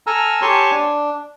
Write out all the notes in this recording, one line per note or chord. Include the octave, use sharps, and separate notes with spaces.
A4 G#5 A#5 E6 F6
G4 C#5 G#5 A5 C6 C#6
D4